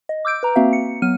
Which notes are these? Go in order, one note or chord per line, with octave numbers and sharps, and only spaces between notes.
D#5
D6 E6 G6 D7
B4 A#5
A#3 C4 F#4 E5 F5
C#7
F#3 B3 F6 D#7